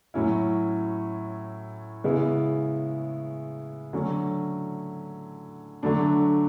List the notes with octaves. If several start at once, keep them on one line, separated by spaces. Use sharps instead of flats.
A2 F#3 C#4 E4
C#3 G#3 B3 E4
D3 F#3 A3 C#4
D3 F#3 A3 D4